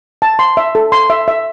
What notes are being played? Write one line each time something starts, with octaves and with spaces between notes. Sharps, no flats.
A5
C6
E5
A4
C6
E5
E5